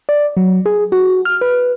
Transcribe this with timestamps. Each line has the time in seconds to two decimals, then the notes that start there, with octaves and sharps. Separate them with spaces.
0.09 D5
0.37 F#3
0.66 G#4
0.92 F#4
1.25 F6
1.41 B4